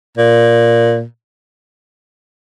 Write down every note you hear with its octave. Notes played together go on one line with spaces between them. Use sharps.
A#2